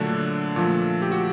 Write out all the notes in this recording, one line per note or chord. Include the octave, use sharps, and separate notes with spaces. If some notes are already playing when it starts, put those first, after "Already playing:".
Already playing: A#2 D3 F#3 A3 D4
A#2 F3 A3
G4
F#4